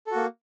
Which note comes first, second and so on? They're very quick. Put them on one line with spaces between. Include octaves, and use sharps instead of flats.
A4 F#4 A#3